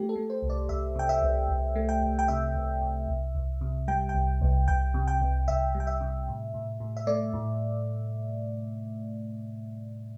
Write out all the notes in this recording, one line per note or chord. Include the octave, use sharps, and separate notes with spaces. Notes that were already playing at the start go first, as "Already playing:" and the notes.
Already playing: A3 G4
A4
A3
C5
C2
D5
C2 E5
C3 G5
E5
C2
C2
A3
G5
C2
G5
C3 E5
C2
C3
C2
C2
C3
G3 G5
G5
C2
C2
C2 G5
C3
G5
C2
C2 E5
G3
G5
E5
C3
A2
A2
A2
E5
A3 D5
A2